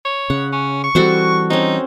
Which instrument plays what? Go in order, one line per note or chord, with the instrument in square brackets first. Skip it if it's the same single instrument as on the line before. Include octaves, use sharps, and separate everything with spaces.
[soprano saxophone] C#5
[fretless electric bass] C#3 [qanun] F#5
[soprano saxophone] C#4
C#6
[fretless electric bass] E3 G3 [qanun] C4 F#4 A4
[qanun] C4 C#4 [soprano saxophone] D#4